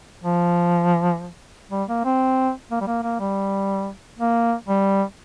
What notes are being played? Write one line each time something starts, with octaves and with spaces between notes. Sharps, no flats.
F3
G3
A#3
C4
A#3
G3
A#3
A#3
G3
A#3
G3